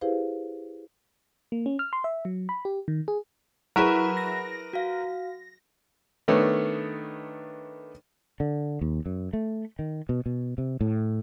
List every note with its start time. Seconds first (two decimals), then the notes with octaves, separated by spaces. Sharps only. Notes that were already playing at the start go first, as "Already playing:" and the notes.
0.01 E4 G4 G#4 B4 C5 F5
1.52 A#3
1.66 C#4
1.79 F6
1.93 C6
2.04 E5
2.25 F#3
2.49 B5
2.65 G4
2.88 D#3
3.08 G#4
3.76 F#3 E4 G#4 A#4 B4 F#5 B5
4.17 A#6
4.73 F#4 F5
6.28 D#3 A3 B3 D4 C#5
8.40 D3
8.81 D#2
9.06 F#2
9.33 A3
9.79 D#3
10.09 B2
10.26 B2
10.58 C3
10.81 A2